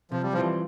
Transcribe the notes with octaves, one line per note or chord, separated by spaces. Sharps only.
C3 F3
G3
F3
E3 G3 C4 F4